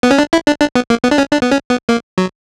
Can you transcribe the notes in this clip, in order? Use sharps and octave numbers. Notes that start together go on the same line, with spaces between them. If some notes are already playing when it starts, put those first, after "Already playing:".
B3
C#4
D4
E4
D4
D4
B3
A#3
B3
D4
C#4
D4
B3
C#4
B3
A#3
F#3